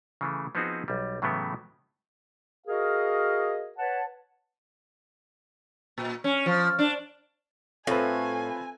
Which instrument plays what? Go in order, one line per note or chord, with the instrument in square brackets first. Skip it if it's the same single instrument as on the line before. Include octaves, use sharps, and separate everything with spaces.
[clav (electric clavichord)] C#3 E3 A3
F3 B3 C4 D#4 F#4 G#4
B1 G3
A2 C#3 E3 F#3 A3 B3
[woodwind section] F#4 G#4 A#4 D#5 F5
B4 C#5 F#5 A5
[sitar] A#2
C#4
F3
D4
[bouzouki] A2 [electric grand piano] C4 [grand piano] F4 B4 [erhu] G#5